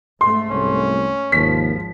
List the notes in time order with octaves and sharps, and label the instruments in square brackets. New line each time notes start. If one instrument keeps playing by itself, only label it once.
[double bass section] G#2 A3 [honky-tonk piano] C6
[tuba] C2 [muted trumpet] C#4
[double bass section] G#1 F3 [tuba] D#2 [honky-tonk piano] B6